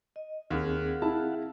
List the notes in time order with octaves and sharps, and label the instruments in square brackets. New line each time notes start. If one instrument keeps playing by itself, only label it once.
[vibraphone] D#5
[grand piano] D#2 [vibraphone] C4 G#4 [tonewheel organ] F5 F#5
[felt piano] E4 [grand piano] A5